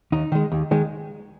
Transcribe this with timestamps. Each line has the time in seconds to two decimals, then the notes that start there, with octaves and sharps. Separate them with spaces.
0.12 D#2 D#4
0.32 D#3 G#3
0.52 D#2
0.71 D#3 G#3